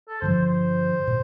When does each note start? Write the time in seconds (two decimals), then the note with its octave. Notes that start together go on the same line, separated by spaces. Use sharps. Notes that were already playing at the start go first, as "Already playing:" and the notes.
0.08 A4
0.21 G2 D3 F3 C5
0.44 C5
1.07 A#2